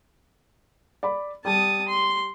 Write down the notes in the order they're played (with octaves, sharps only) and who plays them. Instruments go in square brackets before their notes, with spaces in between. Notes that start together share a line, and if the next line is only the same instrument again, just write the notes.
[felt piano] D5 B5
[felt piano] G3 [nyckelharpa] A5 D#6
[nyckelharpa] C6